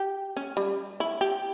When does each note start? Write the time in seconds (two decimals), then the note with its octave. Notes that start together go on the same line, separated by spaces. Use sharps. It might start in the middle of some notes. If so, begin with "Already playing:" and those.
Already playing: G4
0.36 C#4
0.57 G3
1.00 E4
1.21 G4